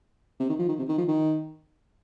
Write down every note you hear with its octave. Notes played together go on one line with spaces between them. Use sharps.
C3
D#3
F3
D#3
C3
D#3
F3
D#3